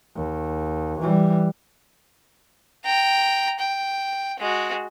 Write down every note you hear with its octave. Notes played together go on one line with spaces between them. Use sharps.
D#2
E3 G3
G5 A#5
G5
G#3 F#4